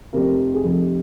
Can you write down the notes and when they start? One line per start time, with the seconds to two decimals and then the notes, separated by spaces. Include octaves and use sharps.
0.13 F1 F2 C3 A#4
0.54 G#4
0.64 F1 F2 C3 A4